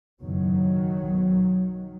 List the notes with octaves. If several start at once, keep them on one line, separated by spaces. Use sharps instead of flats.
F#1 E2 B2 D#3 F#3
B1 B2